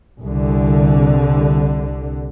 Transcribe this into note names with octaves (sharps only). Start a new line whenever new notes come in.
C2 D3